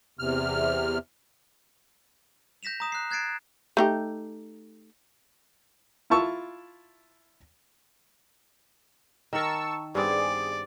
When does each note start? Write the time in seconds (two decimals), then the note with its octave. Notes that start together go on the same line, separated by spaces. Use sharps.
0.19 E2 C3 F6
2.63 G6 A#6 B6 E7 F7
2.80 A#5 D#6 E7
2.92 F#6 C7
3.11 F#6 G#6 A6 C7 D7 E7
3.77 A3 D#4 G4
6.10 E4 F4 A5 C#6 E6
9.33 D#3 A#4 A5 C#6 E6
9.95 G2 B3 C4 G#4 D5